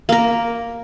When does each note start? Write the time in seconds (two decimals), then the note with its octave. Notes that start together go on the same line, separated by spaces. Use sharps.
0.09 A#3 A#4